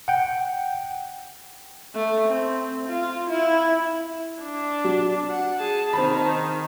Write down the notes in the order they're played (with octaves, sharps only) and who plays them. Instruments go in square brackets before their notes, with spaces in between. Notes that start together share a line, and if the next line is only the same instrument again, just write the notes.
[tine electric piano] F#5 G5
[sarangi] A3
C4
F4
E4
[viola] D4
[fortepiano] F#3
[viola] F#5
G#4 A5
[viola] D#3 D#4 [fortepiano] C4 A5 B5